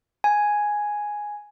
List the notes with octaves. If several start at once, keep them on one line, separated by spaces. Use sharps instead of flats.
G#5